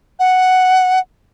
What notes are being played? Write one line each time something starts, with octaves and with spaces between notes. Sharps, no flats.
F#5